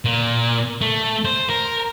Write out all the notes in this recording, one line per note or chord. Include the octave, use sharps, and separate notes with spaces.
A#2
A3
C5
A#4